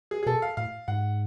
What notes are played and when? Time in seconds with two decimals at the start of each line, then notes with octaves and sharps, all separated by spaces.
0.11 G#4
0.23 G#4
0.26 B2 A4
0.42 F5
0.57 A2 F5
0.88 G#2 F#5